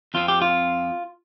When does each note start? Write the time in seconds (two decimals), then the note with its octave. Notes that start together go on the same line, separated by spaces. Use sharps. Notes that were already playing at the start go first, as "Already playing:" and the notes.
0.14 F2 F3 C4 F4
0.28 G4
0.42 F4